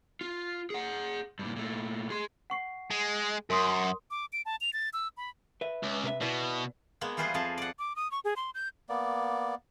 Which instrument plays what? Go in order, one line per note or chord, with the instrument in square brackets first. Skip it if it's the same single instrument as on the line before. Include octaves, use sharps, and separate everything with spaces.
[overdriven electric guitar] F4
G#4 F#5
G2 A#2
A#2 A3
G#4 C6
[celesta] F#5 C#6 C7
[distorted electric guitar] G#3
[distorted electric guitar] F#2 [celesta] A#4 C6 D#6
[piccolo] D6
D7
A5
F7
A6
E6
B5
[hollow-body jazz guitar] B4 E5
[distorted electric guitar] C#2
[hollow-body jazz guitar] C3 B4 E5
[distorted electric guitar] B2 [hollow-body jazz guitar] E4 B4 D5
[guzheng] G#3 A#3 B3
E3 G3 F4 G#4 B4 C5
F2 F3 G#4 A5
D5 F#5
[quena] D6
D#6
C#6
G#4
C6
G6
[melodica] A#3 B3 D5